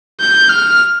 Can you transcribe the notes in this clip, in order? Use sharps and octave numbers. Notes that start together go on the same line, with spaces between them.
G6
F6